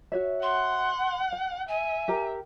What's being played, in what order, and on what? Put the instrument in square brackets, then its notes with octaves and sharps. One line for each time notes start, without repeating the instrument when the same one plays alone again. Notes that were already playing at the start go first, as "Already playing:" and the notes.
[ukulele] F#4 C#5 E5
[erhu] F#5 [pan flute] C6
[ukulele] G5
[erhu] E5 [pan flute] G#5
[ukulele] G4 A#4 A#5